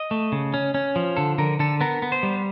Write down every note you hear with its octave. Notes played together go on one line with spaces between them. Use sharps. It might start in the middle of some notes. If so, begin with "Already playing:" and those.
Already playing: D#5
A3
C#3
C#4
C#4
F3
D3 A4
D3 A#4
D3 A4
B3 A#4
B3
C5
G3